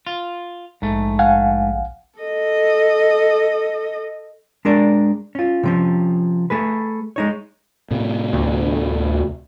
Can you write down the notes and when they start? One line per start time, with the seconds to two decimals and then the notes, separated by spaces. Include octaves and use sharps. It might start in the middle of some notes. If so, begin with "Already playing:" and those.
0.07 F4
0.82 A#1 G#2 A3
1.19 F5 F#5 G#5
2.20 A4 D#5
4.65 G#3 D4 A#4 D5
5.35 C#4 F4
5.63 C3 F3 C#4
6.50 A3 G#4 B4
7.16 G#3 D#4 C#5
7.91 A2 C3
8.33 D2